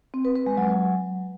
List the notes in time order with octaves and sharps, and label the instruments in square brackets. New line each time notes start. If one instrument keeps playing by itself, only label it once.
[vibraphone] C4
B4
B4
G#3
F#3